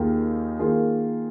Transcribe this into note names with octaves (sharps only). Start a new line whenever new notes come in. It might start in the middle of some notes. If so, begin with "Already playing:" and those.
Already playing: D#2 D#3 A#3 F4 G#4
D#3 A#3 F4 G#4